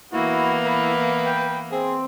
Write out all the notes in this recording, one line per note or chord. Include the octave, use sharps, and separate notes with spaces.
E3 A#3 B3 E4 F#4
B4
G5
C4 G#4